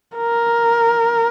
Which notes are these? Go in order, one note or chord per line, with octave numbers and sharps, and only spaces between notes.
A#4